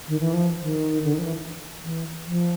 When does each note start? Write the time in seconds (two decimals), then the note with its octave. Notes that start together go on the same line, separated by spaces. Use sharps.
0.08 D#3
0.20 E3
0.34 F3
0.62 D#3
1.04 D3
1.13 D#3
1.19 F3
1.24 E3
1.85 E3
2.27 F3